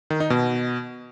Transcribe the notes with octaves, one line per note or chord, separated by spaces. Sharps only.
D#3
D#4
B2